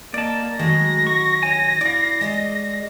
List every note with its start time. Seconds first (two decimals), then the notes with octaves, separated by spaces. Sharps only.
0.14 A#3 D5 D#5 A5
0.59 D#3 F#3 G#3 A3 F#4 A#6
1.07 C#6
1.43 C#5 G#5
1.81 E4 D5 F5
2.21 G#3 A3 D#5